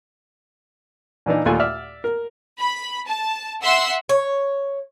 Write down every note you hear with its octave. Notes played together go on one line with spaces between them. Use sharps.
A#2 E3 D4 D#4
D#2 A#2 A3 F4 G#5 F#6
D5 E5 F6
A#4
B5
A5
E5 F#5 C6 E6
C#5